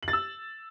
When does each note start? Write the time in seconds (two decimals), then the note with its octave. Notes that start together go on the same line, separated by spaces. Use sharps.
0.03 F#7
0.08 A6
0.13 E6